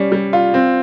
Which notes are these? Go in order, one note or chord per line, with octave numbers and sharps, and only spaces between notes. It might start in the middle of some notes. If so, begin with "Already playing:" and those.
Already playing: G3 C#4
G3
F4
C4